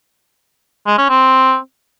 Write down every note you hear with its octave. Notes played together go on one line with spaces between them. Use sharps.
G#3
C#4
C4